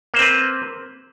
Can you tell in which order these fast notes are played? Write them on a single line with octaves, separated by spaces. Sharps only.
A#3 C5 C4 B4